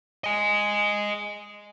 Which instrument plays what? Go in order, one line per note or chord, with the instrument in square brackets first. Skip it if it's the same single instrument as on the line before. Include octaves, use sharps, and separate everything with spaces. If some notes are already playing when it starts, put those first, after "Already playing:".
[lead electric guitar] D#5 G#5